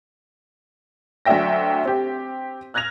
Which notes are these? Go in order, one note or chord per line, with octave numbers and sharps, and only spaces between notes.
D2 F#3 D5 E5 G5 A#6
C4 G4
F6 F#6 G#6 A#6 F7